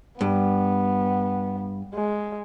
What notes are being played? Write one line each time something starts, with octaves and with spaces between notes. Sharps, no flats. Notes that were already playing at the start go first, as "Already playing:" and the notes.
G2 B3
G#3